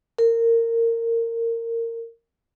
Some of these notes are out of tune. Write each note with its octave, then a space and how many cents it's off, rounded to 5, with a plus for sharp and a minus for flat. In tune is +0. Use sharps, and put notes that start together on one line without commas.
A#4 -20